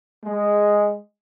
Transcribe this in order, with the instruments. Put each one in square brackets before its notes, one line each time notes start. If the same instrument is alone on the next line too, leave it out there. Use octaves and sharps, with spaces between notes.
[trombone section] G#3